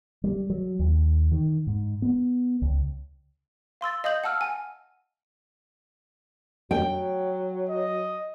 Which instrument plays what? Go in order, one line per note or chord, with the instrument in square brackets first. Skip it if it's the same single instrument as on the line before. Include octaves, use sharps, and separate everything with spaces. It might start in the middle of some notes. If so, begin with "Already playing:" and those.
[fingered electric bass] G3
F#3
D#2
D#3
G#2
B3
C#2
[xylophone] F5 C6 E6 A6
D#5 F5 D#6 G6 F#7
F#5 A5 E6 F6
G#5
[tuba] F#3 [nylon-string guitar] G5
[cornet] D#5